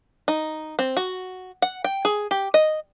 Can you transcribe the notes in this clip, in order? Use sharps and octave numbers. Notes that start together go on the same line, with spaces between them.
D#4
C4
F#4
F#5
G5
G#4
G4
D#5